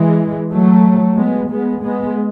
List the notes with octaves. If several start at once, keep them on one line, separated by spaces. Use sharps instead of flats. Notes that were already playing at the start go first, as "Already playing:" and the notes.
Already playing: E3 G#3
F#3 A3
G#3 B3
G#3 B3
G#3 B3